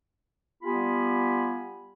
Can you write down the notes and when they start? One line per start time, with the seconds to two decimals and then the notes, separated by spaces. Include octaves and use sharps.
0.63 G3 B3 F4 G4 G#5 B5